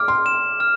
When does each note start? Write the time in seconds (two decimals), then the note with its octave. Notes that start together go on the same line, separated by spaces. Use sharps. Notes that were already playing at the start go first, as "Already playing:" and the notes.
Already playing: D6 F6
0.08 C6
0.26 E7
0.60 F6